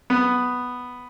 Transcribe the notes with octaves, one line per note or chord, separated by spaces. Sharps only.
B3